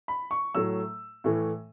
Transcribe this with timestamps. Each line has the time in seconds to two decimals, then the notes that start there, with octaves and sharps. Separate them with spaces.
0.08 B5
0.31 C#6
0.55 A2 F#3 A3 E6
1.24 A2 E3 A3